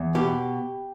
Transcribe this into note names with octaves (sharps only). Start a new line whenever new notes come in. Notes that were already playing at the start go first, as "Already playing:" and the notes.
Already playing: E2
B2 G4